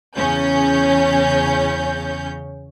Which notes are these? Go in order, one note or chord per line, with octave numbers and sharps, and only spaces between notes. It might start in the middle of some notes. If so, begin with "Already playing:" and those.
E2 C#3 C#4 G6